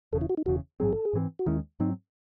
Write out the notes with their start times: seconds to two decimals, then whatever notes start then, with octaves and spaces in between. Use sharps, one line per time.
0.12 E1 E2 C#3 A4
0.21 E4
0.30 F#4
0.37 D#4
0.45 E1 E2 C#3 F#4
0.80 A1 G#2 F#3 C4 G#4
0.93 A4
1.05 G#4
1.13 G#2 E3 C4
1.39 F#4
1.46 D#2 D#3 G#3 C#4 E4
1.80 G#2 F#3 C4 D#4